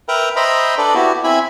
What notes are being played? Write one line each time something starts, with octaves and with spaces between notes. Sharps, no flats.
A#4 B4 E5 G5 A#5
C5 D#5 E5 G5 A#5 B5
D4 A4 B4 D5
B3 E4 F#4 G4
C4 E4 E5 G#5 B5